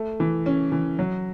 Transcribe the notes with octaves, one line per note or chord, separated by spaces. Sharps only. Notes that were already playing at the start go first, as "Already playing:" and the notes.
Already playing: A3
E3
C#4
E3
F#3